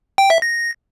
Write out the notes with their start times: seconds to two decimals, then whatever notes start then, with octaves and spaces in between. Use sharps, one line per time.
0.18 G5
0.30 E5
0.42 A#6